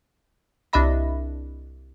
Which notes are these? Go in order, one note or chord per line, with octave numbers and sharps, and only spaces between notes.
C2 D4 D#5 E5 B5 A#6